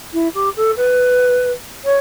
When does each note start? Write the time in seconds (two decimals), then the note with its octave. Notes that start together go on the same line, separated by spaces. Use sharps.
0.13 E4
0.34 G4
0.56 A4
0.77 B4
1.84 C#5